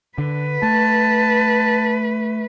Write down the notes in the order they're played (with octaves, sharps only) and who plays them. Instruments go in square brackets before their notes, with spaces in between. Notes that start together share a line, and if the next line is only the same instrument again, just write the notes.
[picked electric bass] D3 [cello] B4
[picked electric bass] A3 [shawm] A5